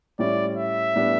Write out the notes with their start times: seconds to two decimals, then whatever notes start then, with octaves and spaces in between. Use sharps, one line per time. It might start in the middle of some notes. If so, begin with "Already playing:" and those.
0.19 A2 G3 C#4 E4 D5
0.57 E5
0.96 A2 G3 B3 D4